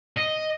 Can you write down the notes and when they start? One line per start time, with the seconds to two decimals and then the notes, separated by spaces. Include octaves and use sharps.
0.17 D#5